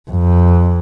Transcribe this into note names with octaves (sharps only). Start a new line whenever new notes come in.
F2